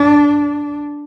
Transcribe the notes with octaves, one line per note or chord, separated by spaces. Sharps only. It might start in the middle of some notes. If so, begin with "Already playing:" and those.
Already playing: D4